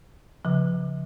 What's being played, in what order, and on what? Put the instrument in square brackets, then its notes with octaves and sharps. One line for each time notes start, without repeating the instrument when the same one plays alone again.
[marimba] C#3 F3